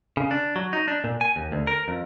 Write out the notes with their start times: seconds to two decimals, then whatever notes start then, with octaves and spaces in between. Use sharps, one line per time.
0.17 C#3
0.31 D4
0.56 F#3
0.73 D#4
0.88 D4
1.04 A#2
1.21 G#5
1.36 D#2
1.52 D2
1.67 A#4
1.88 F2